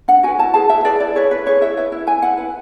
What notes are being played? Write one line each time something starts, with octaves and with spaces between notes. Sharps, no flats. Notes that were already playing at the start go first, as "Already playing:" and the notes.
D4 F#5
F#4 B4 G#5
E4 A5
G#4 B4 A5
E4 E5
G#4 B4 D5
E4 D5
G#4 B4 C#5
E4 B4
G#4 B4 C#5
E4 E5
B4 E5
E4
B4 G#5
E4 F#5
B4